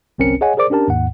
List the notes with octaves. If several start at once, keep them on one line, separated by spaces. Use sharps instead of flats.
G1 C2 C4 C#4 A#4 C#7
G#4 C#5 D#5 F#5 G#5
G#4 A#4 C5 D5 D6
C#4 D4 G4 A#4 A5
D#2 G#2 F#5